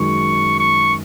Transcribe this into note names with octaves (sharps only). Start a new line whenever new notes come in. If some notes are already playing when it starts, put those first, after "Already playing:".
Already playing: F#2 D#3 G#3 C#6
C#6